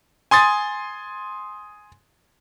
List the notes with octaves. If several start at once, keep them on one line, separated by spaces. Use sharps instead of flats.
G#5 C6 D#6 A6